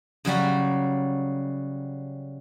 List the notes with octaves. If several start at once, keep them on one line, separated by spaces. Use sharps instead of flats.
C#3 F#3 G3 F#4